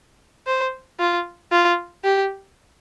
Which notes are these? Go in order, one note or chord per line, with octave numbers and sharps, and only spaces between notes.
C5
F4
F4
G4